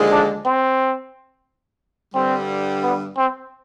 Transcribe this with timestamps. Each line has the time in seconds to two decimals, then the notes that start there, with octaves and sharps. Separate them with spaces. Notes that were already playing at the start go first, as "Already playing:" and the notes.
Already playing: D#2 D3 F3 G#3
0.12 D4
0.45 C4
2.15 G2 D3 G3 C4
2.83 B3
3.17 C4